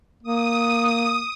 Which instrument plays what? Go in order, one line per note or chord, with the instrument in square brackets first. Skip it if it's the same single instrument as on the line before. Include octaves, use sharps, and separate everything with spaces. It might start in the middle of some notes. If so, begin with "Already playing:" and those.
[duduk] A#3 [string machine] D#6